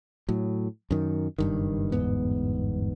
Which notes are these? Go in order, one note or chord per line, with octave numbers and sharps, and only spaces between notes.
A2 F#3
F#2 D#3
F#1 G2 D#3
G1 E2 G#2 B3